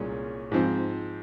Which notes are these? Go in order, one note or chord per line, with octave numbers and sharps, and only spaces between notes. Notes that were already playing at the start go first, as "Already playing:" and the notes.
Already playing: C2 A#2 G#3 C#4
G#2 F3 C4